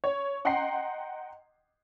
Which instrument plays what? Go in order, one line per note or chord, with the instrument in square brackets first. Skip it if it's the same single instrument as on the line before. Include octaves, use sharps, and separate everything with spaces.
[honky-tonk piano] C#5
D#5 F#5 G5 A#5 C6 C7